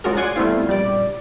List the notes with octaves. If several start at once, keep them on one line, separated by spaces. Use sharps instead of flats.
G#3 C#4 F4 F#4 G#4 A#4
D5 F#5 G#5 C6 G#6
G3 A3 B3 C4 E4 F4
A#1 G3 D5